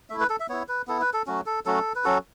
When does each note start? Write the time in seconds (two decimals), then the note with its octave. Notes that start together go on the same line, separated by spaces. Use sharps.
0.10 A3 E4 E5
0.20 B4
0.30 A4
0.40 E5
0.49 B3 E4 C#5
0.68 B4
0.87 B3 E4 A4
1.01 B4
1.13 A4
1.27 F#3 A3 C#4 F#4
1.46 A4
1.65 F#3 A3 C#4 F#4 A4
1.95 B4
2.04 F#3 C#4 F#4 A4